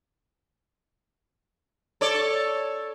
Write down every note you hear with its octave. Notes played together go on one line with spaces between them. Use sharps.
A4 C#5 D5